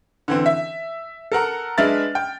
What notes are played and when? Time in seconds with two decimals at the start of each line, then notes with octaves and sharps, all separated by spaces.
0.28 D3 E3 C4
0.46 E5
1.32 A4 A#4 F#5 A#5
1.78 G#3 D4 B4 E5 F6 A6
2.15 G5